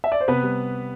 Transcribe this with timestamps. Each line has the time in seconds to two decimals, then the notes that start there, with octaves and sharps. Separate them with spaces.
0.04 E5
0.12 D5
0.21 C5
0.28 C3 B3 B4
0.43 G3